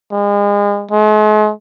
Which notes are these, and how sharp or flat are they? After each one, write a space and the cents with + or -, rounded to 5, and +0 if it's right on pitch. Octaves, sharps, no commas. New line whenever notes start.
G#3 -35
G#3 +45